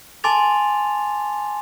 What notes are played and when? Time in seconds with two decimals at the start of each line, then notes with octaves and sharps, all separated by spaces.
0.24 G#5 A5 C6 D6 A6 F7